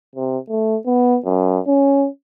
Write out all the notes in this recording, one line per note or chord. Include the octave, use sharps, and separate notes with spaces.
C3
A3
B3
F#2
C#4